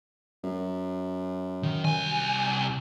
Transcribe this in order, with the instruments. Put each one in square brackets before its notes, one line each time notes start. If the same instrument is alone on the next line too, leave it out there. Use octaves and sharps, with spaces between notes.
[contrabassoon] F#2
[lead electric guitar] D#3
C2 G#5